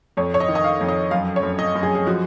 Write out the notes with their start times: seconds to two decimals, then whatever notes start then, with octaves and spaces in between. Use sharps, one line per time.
0.17 F2 C#5
0.34 C#5
0.40 D#5
0.48 D#3
0.55 D#5
0.64 F5
0.81 F2
0.89 D#5
1.11 F#2 F5
1.36 C#5
1.43 F#2
1.59 D#5
1.75 F#2
1.83 G#4
1.95 G#4
2.06 F3 F#4